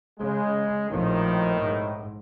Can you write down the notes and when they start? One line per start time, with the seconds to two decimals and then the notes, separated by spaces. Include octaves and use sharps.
0.19 C#3 G#3
0.90 A#1 A2 D#3 F3 C4
1.62 G#2